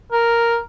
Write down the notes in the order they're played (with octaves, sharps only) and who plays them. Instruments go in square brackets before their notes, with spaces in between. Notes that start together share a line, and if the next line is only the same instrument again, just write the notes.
[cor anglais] A#4